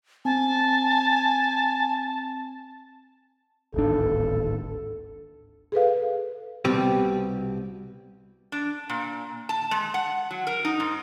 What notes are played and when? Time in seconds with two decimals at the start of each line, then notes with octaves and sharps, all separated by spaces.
0.25 C4 G#5 A5
3.74 D1 G#1 D4 A4
5.72 G#4 A4 B4 F5
6.65 C2 B2 G3 C4 G4
8.52 D4
8.90 A#2
9.49 A5
9.71 G#3
9.94 F#5
10.31 F#3
10.47 A#4
10.65 D#4
10.80 G#2